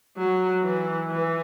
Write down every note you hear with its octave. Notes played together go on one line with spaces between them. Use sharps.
F#3
E3
E3